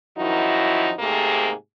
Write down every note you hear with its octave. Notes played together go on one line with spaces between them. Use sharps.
F#2 D#3 F3 D#4 E4 F#4
G#2 C3 A3 A#3 G4 G#4